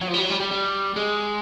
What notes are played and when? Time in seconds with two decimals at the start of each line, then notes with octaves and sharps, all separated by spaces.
0.01 F#3
0.08 F3
0.14 G3
0.19 F#3
0.30 G3
0.40 G3
0.51 G3
0.96 G#3